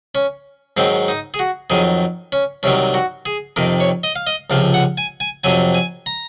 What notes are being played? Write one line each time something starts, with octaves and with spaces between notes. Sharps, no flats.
C#4
G#2 D#3 F#3 C4
D#4
G#4
F#4
F2 D#3 F#3 G#4
C#4
C2 C3 D#3 F#3 C#4
F#4
G#4
F2 C3 D#3 A#4
C#5
D#5
F5
D#5
C#2 C3 F3 F5
F#5
G#5
G#5
F2 C3 F#3 G#5
G#5
A#5